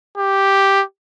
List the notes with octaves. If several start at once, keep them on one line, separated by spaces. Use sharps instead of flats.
G4